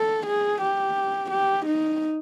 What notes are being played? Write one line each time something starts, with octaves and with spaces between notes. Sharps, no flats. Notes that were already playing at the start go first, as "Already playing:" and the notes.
Already playing: A4
G#4
G4
G4
D#4